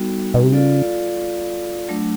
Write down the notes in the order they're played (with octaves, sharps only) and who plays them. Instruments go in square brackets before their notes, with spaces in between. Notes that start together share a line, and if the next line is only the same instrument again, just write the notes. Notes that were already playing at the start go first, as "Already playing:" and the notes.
Already playing: [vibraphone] G3 B3 D#4 F#4 A4
[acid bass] B2
C3
[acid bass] C#3 [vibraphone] F4 A4 D5 F5
[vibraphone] F#3 A3 D4